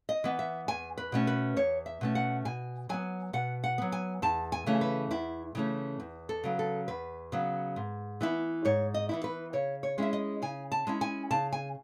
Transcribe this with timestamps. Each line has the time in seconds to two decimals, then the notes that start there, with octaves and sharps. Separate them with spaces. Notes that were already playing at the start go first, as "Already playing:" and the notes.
0.09 D#5
0.24 E3 B3
0.39 E5
0.68 E2 G#5
0.98 B4
1.12 B2 A3 C#4
1.27 B4
1.56 E2 C#5
1.86 E5
2.01 B2 A3 C#4
2.15 F#5
2.45 B2 G#5
2.89 F#3 B3 G#5
3.33 B2 F#5
3.64 F#5
3.78 F#3 B3
3.92 G#5
4.22 E2 A5
4.52 G#5
4.66 C#3 E3 A3 C#4
4.81 B4
5.11 E2 E4
5.55 C#3 E3 A3 C#4
6.00 E2
6.29 A4
6.44 C#3 F#3 B3
6.59 A4
6.88 E2 B4
7.32 C#3 F#3 B3
7.76 G#2
8.21 E3 B3 E4
8.65 G#2 C#5
8.94 D#5
9.09 E3 B3 E4
9.24 B4
9.53 C#3 C#5
9.83 C#5
9.98 G#3 C#4 E4 E5
10.13 D#5
10.42 C#3 G#5
10.72 A5
10.87 G#3 C#4 E4
11.01 G#5
11.31 C#3 A5
11.53 G#5